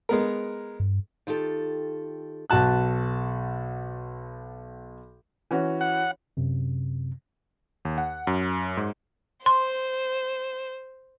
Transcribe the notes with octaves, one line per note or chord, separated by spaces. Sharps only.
G#3 B3 A#4
G2
D#3 F4 G4 A4
B1 F#4 A5 F#6
E3 C#4 F#4
F#5
F#2 C3
D#2
F#5
F#2
G#2
C5 C6